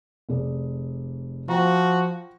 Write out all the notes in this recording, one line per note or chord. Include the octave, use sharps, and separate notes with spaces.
F1 G#4 D5
F3 F#4 G5 A#5